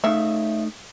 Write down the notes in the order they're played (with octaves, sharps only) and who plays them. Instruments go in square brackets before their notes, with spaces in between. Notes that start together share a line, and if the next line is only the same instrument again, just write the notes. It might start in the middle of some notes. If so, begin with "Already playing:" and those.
[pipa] C#3 E5 [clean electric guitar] A3 D#4